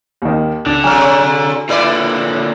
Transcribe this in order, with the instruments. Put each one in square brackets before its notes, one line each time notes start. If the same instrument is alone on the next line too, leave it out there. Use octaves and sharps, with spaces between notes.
[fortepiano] D#2 D#3
[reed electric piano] C#2 [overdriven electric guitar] D3 [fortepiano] D4
[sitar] C3 F#3 [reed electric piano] G#5 F6
[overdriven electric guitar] A#2 D3 [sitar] E4 B4 D5